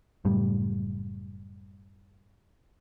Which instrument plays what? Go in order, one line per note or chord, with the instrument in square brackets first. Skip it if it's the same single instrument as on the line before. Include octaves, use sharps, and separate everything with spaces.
[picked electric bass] F#1 A2 G3